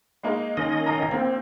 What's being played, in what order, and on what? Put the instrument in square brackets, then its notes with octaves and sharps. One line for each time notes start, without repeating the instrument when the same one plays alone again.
[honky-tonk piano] G#3 A#3 D#4
[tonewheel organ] D#3 C#4 D#5
[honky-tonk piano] A1 A#5
[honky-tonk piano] A#3 [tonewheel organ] C4